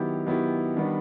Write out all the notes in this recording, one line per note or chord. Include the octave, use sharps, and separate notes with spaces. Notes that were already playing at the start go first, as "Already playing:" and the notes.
Already playing: D#3 F#3 B3 E4 G4
D#3 F#3 B3 E4 G4
D#3 G3 B3 D4